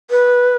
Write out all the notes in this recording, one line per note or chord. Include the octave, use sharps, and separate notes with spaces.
B4